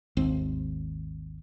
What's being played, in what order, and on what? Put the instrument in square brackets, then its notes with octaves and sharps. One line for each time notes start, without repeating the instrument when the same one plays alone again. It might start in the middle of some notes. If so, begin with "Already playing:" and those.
[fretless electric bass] G#1 D#2 C4